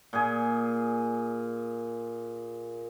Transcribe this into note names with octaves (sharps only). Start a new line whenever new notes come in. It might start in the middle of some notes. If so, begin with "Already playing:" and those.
A#2 G#4